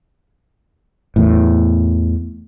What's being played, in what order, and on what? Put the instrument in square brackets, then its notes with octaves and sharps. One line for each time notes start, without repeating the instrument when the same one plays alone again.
[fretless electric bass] E2 A2